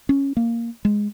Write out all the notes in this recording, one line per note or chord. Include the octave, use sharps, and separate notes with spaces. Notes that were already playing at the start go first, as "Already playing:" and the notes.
C#4
A#3
G#3